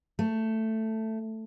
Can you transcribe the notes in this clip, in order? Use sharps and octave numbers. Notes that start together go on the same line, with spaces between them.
A3